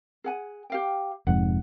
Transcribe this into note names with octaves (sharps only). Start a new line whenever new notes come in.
G#4 F#5 G#5
G4 F5 G5
F1 F2 G#2 F#5